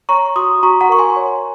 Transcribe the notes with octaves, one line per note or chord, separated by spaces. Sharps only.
C#5 A#5 C#6
F#4 C6 D#6
F#4 A#5 C#6
F#5 A#5
A#4 C#6
G#5 C6
C#5